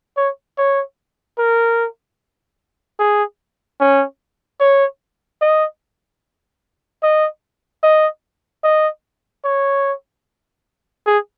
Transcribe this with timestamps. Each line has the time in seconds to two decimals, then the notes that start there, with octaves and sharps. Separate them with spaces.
0.17 C#5
0.58 C#5
1.38 A#4
2.99 G#4
3.80 C#4
4.61 C#5
5.41 D#5
7.03 D#5
7.83 D#5
8.64 D#5
9.45 C#5
11.06 G#4